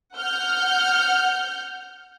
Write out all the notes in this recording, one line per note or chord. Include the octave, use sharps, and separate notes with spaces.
F#5 F6 G6